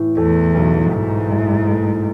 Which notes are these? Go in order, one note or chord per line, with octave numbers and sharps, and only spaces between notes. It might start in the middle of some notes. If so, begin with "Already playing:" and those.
Already playing: A2 E3
E2 A3
B1
G#2 E3
A2
A3